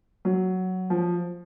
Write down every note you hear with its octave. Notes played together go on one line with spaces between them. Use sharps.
F#3
F3